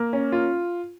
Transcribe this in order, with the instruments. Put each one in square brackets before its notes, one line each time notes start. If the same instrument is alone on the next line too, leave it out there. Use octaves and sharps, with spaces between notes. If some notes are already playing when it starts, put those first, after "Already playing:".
Already playing: [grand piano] A#3
C#4
F4